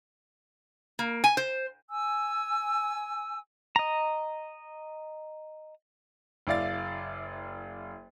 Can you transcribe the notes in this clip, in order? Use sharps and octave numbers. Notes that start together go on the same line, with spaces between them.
A#3
G#5
C5
G#5 E6
D#5 A#5
F#1 E4 D5 F5 A6